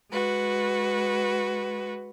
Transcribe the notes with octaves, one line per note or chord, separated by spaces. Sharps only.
G#3 F#4 B4